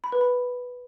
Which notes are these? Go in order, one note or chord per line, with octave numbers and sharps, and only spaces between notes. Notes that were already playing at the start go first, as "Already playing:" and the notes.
B5
B4
B5